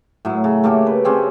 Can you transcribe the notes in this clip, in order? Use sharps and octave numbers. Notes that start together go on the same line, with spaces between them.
A2 F#3
C#3
A3 A#3 G4 A4
B4
C#3 C4 C#4 G4